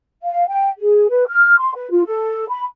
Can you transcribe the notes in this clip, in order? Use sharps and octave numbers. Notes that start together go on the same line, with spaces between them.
F5
G5
G#4
B4
F6
C6
B4
F4
A4
B5